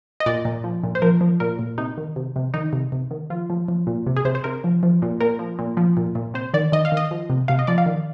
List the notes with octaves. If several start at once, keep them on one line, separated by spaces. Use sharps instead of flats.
D#5
A#2 D5
A#2
F3
A#2
C5
F3 A#4
F3
A#2 A#4
A#2
C3 D#4
D#3
C3
C3
D#3 D#4
C3
C3
D#3
F3 F4
F3
F3
A#2
C3
G#4
C3 C5
C5
C3 A#4
F3
F3
A#2
A#2 A#4
F3
A#2
F3
A#2
A#2
C3 C5
D#3 D5
D#3 D#5
F5
D#3
D#5
F3
C3
C3 F5
D#5
F3 D5
F5
D#3